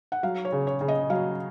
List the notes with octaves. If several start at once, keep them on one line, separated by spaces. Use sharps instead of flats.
F#5
F#3 F5
C#5
C#3
C#5
C#3
D#5
F#3 F5